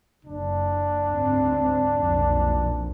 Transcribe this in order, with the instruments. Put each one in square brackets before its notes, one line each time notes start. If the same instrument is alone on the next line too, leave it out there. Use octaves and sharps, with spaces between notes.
[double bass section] F#1 [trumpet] D4
[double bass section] D2 G#2 C4
B1 F2 A#2